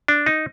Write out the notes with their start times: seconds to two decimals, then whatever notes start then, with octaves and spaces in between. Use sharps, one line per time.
0.08 D4
0.26 D#4